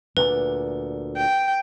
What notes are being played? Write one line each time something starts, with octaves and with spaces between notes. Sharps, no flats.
D2 A#2 B4
G5